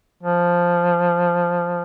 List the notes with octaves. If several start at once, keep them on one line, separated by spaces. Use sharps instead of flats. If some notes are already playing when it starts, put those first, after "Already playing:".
F3